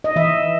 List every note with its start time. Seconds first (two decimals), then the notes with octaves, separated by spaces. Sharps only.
0.04 D#5
0.16 E3 E5